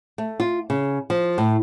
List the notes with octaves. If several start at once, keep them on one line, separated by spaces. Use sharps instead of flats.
A3
F4
C#3
F3
A2